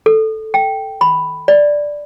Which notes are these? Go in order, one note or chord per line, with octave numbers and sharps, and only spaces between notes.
A4
G5
B5
D5